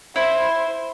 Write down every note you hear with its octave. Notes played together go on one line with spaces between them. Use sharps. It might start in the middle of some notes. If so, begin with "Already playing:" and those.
E4 C5